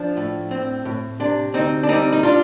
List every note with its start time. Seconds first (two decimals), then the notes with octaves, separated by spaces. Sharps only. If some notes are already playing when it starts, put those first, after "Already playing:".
Already playing: F3 D4
0.17 A2
0.51 C4
0.85 A2
1.20 C3 D4
1.54 D2 C4 D#4
1.83 D4
1.89 G3 C4 D#4
2.12 D#4
2.23 D4 F4